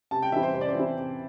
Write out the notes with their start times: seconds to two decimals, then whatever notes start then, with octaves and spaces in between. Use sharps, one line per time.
0.11 C3 A5
0.22 G5
0.32 E3 E5
0.35 C4 E4
0.43 C5
0.54 C3 C5
0.61 D5
0.68 C5
0.75 E3 C4 E4
0.97 C3